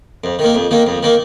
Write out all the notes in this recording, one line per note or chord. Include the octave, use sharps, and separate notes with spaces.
F2
D#3 A#3
F2
D#3 A#3
F2
D#3 A#3